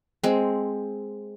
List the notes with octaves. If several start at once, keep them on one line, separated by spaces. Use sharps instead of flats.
G#3 C4